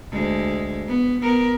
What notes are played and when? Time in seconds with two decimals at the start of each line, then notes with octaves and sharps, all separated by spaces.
0.12 D2 G#3
0.87 B3
1.21 B3 A#4